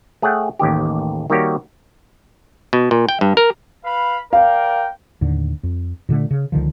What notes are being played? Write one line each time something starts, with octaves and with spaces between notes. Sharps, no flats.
A3 G#4 C#5 F#5 G5
A1 D#2 D#3 G4
D#3 G3 A#3 F#4 G4 C#5
B2
A#2
G5
G2
A#4
B4 F5 B5
A#4 D5 F5 G5
D#2 A2 D3
F2
A#2 D3 E3 A3
C#3
C#2 D3 D#3 F3